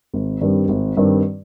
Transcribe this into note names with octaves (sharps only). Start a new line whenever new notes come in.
G#1
G2 D#3 G3 C4
G#1
G2 D#3 G3 C4